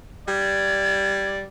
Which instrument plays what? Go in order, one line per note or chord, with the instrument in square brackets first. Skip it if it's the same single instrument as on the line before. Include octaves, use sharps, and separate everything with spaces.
[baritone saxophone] G3 [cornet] D5 [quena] G#6